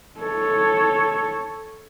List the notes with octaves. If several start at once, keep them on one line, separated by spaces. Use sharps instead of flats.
A4 C#5